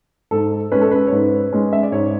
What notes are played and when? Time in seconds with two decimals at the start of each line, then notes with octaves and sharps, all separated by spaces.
0.31 G#2 A4
0.72 G#3 C#4 B4
0.81 A4
0.91 B4
1.07 C#5
1.12 G#2 B4
1.53 G#3 C#4
1.73 E5
1.83 D5
1.92 G#2 C#5